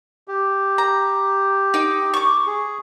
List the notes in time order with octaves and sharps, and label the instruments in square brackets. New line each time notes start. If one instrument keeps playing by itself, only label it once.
[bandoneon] G4
[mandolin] A#5
D#4 G5
C#6 D6
[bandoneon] G#4